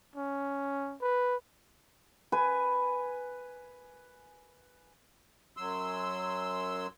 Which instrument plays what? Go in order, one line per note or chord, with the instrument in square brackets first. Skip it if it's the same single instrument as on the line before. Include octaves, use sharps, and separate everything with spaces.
[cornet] C#4
B4
[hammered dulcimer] B4 G#5
[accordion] F#2 F#3 C6 E6